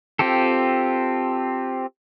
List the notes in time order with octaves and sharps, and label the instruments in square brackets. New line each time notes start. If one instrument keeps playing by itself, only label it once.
[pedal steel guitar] C4 F4 G4 A4